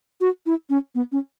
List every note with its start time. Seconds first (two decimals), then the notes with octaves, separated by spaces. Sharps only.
0.21 F#4
0.46 E4
0.70 C#4
0.95 B3
1.12 C#4